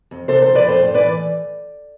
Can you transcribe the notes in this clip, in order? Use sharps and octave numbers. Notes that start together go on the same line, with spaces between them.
F2
C3 A4 C5
F3 A4 C5
B4 D5
F2 A4 C5
A2
E3 B4 D5